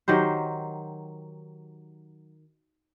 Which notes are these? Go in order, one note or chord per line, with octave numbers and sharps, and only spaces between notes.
D#3 F#3 G4 C5